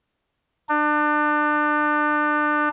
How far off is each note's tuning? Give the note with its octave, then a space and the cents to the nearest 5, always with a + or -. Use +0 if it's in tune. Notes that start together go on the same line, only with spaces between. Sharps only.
D4 +30